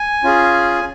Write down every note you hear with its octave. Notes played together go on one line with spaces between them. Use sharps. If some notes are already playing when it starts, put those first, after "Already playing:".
Already playing: G#5
C#4 F4 G#4